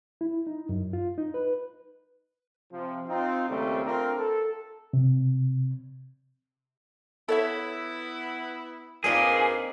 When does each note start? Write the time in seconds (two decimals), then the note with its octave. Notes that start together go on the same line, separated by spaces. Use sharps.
0.21 E4
0.47 D#4
0.69 F#2
0.93 F4
1.18 D#4
1.34 B4
2.72 C3 F3
3.07 C4 D#4 F4
3.48 D#2 A#2 C#3 G3 A3 C4
3.85 A3 C4 D4 F4 A#4
4.18 A4
4.93 C3
7.29 B3 E4 A4 C#5 E5
9.04 G2 A#2 A#3 C4 D#4 G#4